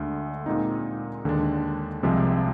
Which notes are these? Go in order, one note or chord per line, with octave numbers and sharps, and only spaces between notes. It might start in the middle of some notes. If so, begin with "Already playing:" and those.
Already playing: D2 D3 G#3
A#2 G#3 C4 D#4
D#2 D3 G#3 D4
C2 C3 F3 G#3 C4